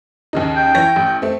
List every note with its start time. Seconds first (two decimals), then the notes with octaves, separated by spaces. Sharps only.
0.33 D#2 C#3 D#4
0.56 G5
0.75 E3 C#5 A#6
0.96 A1
1.22 A3 C4